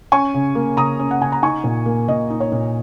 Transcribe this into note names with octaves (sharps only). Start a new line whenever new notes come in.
C#4 G#5 C#6
C#3
A#3
C#3 A#5 D#6
C#4
F#5
C#3 G#5
A#5
D#4 G#5 C#6
A#2
A#3
A#2 D#5
D#4
C#5
A#2